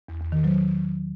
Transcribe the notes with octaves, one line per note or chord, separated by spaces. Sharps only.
E2
E2
D#3
F#3